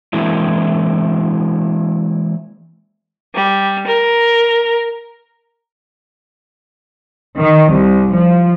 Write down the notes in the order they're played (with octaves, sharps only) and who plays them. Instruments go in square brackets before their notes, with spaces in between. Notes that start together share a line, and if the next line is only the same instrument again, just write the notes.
[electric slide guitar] E3 G#3 A#3 C4 D4 E4
[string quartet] G3
A#4
[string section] D#3
C2
F3